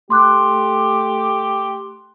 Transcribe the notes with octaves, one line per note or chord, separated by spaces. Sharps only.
A3 G4 C6 D6 F#6